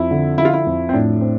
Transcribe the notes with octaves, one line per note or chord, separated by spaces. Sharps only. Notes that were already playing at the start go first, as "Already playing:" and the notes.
Already playing: F2 E4
D3
F3 E4
F4
E4
F2
C4
A2 D4
C4